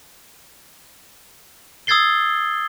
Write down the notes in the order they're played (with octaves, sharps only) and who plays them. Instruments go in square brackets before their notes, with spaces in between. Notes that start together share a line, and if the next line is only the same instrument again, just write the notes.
[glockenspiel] D#6 E6 G#6 A6 C7 G7